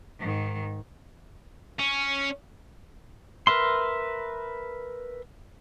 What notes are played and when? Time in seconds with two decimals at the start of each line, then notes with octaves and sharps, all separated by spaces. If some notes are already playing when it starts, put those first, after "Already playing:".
0.19 G#2 D#3
1.79 C#4
3.47 A#4 B4 E5 C6